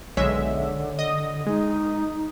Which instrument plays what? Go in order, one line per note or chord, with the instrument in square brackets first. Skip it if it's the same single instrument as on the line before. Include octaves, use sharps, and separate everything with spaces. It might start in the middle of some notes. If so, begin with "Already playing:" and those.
[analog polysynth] B1 G#3 E5 [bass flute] D3 [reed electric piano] C#5
[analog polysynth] D#5 D#6
[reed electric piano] G#3 [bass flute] D#4